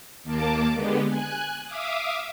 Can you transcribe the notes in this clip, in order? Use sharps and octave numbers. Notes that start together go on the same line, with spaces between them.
D#2 A#3 A5 D6
D3 G#3 B3 G4
G#5 F#6
E5 F5 D6 D#6